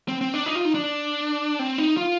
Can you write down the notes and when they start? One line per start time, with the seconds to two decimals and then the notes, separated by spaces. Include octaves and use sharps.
0.08 C4
0.21 C4
0.34 D4
0.46 D#4
0.55 F4
0.65 D#4
0.74 D4
1.59 C4
1.78 D#4
1.97 F4